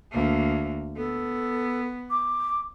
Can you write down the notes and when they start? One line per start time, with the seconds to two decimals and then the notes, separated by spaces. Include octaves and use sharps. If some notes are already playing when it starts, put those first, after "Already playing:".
0.12 D2 A#3
0.96 B3 A4
2.10 D6